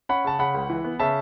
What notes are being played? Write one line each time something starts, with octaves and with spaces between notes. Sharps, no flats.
C#4 F#5 B5
C#3 A5
C#3 F#5 B5
C#2
E3
B3
C#3 E5 A5